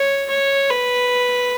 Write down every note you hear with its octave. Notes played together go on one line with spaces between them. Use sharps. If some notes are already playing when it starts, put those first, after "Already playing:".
Already playing: C#5
C#5
B4